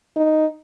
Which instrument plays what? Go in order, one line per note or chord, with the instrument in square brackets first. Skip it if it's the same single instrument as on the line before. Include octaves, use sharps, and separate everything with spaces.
[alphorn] D#4